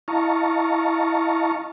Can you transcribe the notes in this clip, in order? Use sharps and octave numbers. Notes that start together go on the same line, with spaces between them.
E4 D#5 F5 A5 A#5 C#6